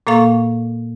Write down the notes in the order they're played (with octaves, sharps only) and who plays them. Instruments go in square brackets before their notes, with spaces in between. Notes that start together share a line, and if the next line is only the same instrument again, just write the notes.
[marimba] A#2 A#3 A4 F5 C#6